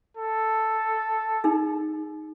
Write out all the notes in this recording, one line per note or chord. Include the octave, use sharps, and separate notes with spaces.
A4
D#4 G#4